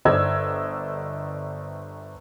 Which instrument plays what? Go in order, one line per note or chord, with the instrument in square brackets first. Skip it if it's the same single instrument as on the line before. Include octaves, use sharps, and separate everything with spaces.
[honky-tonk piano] G1 C5 D5 D#5 E6 G#6